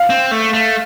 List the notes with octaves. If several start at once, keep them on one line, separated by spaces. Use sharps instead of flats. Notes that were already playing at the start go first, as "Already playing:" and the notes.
Already playing: F5
C4
A3
A3